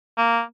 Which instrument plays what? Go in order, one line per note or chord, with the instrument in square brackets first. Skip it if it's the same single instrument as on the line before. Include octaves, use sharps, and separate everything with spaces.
[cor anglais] A#3